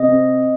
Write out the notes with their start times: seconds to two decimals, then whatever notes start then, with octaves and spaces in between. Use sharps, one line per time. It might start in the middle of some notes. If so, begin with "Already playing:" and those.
Already playing: C3 D#5
0.09 C4